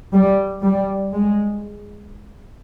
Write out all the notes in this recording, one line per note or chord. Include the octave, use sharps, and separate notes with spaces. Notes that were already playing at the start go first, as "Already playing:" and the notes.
G3
G3
G#3